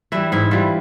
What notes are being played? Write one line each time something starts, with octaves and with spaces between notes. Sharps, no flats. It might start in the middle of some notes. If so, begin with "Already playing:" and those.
E3 G3 E4
G#2 E4
E3 G3 F4